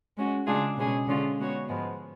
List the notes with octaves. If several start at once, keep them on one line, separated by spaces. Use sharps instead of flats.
G#3 C#4 F#4
C#3 G#3 D4 F4 G#4
B2 G#3 C#4 G#4
D3 G#3 C#4 F4
G#3 B3 F#4 C#5
G#2 F3 G#3 B3